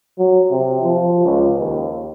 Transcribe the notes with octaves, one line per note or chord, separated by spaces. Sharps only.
F#3
C3
F3
C#2
D#2